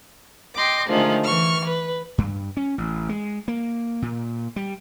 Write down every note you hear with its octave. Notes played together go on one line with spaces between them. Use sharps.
D#5 G5 C6 D6
D3 D#3 F3 G#3 A3
E3 C#6 F6
B4
G2
C#4
A1
G#3
A#3
A#2
G3